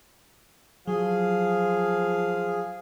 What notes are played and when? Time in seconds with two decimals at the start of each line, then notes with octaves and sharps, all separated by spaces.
0.87 F3 F#3 G#4 F5